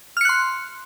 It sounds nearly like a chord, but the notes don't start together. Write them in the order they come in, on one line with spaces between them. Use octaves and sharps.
F6 C#7 F#6 C6